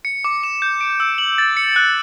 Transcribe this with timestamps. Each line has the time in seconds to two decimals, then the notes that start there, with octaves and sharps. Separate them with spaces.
0.05 C#7
0.25 D6
0.43 E7
0.62 G6
0.81 D7
1.00 E6
1.18 F#7
1.38 A6
1.57 C#7
1.76 F#6